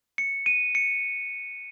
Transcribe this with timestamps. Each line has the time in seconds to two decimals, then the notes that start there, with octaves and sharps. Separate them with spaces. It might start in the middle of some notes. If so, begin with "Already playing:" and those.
0.18 C#7
0.46 D#7
0.75 C#7